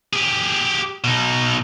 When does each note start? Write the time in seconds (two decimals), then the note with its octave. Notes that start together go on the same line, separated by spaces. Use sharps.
0.13 G4 G#4
1.04 B2 D#4